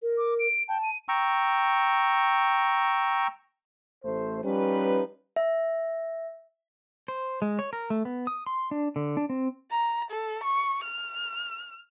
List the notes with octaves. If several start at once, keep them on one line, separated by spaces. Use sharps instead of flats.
A#4
D6
D7
G5 A5
D#7
G5 A#5 C#6 E6
A1 A3 C5
F3 G3 C#4 D#4 B4
E5
C5
G#3
C#5
A#4
A3
B3
D#6
C6
D4
D3
D4
C4
A#5
A4
C#6
F6